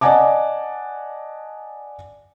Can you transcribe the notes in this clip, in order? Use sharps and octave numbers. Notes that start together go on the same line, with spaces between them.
D5 D#5 F#5 G#5 A5 D6